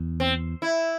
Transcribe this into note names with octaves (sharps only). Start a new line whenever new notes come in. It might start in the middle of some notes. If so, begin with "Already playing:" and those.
Already playing: E2
C4
E4